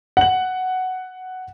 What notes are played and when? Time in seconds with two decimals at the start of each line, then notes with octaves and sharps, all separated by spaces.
0.17 F#5 F#7